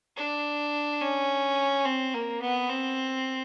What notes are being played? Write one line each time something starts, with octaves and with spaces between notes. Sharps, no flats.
D4
C#4
C4
A#3
B3
C4